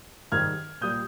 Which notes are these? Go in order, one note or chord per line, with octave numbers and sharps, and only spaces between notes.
G#2 D#3 G3 F6 G#6
A#2 G3 D#6 G6